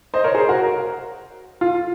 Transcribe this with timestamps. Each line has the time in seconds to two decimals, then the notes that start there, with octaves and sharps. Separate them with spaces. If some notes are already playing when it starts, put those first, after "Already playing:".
0.14 C5 D#5
0.24 A#4 C#5
0.34 G#4 C5
0.49 F#4 A#4
1.61 F4